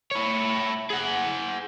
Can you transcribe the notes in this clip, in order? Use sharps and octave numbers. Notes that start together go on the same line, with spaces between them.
E4 C#5
G#4 F#5